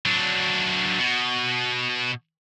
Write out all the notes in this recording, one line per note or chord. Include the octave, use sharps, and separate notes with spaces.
F#3 D4
B2